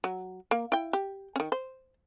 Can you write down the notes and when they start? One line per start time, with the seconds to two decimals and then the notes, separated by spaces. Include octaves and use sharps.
0.04 F#3
0.51 A#3
0.72 E4 G5
0.93 G4
1.36 D#3 C#4
1.52 C5